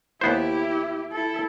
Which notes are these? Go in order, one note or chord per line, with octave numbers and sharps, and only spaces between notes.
D#2 B3 E4 G4 C5
E4 A4